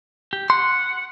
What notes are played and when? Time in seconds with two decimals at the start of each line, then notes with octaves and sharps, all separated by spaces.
0.33 G4
0.50 F#5 C6